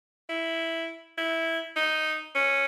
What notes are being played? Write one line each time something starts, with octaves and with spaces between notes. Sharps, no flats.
E4
E4
D#4
C#4